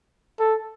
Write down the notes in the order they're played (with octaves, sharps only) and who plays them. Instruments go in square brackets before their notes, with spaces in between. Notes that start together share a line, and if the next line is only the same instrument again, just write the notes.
[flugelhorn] A4